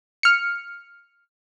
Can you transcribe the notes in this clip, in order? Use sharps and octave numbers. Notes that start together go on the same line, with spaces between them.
F6 C#7